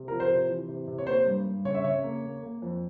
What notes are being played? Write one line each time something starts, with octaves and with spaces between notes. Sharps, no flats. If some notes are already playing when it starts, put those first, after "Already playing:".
Already playing: C3
F3 A#4
C5
C3
E3
C3
C3
C#5
A#3 C5
G2
G2
C#3 C#5
E5
C#3 C#5
A#3
A#3
A#3
F2